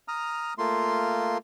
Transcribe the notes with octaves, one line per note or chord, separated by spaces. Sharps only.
A#5 D#6 F6
A3 A#3 F4 C6